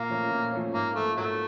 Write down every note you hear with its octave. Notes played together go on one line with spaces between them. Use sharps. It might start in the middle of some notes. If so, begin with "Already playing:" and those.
Already playing: A#2 A#3
F3 A3 C#4
A#2
F3 A3 C#4
G#2 A#3
F3 A3 A#3
G#2 F#3 A3